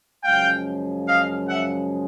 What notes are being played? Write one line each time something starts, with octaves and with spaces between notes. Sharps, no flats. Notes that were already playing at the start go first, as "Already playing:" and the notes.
F#2 C#3 F3 G#3 F5 G5
D#5 F5
E5 F#5